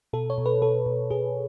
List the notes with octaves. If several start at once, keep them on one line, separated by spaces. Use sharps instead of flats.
B2 A4
C#5
B2
B4
B2 A4
B2
B2 G#4